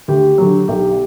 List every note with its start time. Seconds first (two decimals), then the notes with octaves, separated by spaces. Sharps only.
0.08 D2 G4
0.38 D3 F#3
0.68 B1 G4